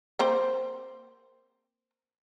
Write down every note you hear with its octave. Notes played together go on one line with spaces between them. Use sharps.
A#3 C4 C5